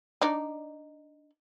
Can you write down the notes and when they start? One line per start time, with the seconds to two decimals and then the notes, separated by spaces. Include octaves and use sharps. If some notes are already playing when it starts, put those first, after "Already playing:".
0.21 D4 D#4 D5